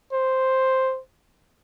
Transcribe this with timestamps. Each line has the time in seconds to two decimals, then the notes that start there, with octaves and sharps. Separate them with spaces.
0.13 C5